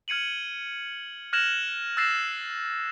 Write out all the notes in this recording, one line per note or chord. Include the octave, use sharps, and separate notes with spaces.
F6 G#6 C#7 D#7 F#7
F6 F#6 G#6 A#6 E7 F#7
E6 F#6 A6 A#6 C7 E7